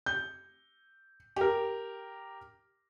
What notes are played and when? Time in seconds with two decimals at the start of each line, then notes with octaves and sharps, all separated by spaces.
0.06 G6
1.36 G4 A#4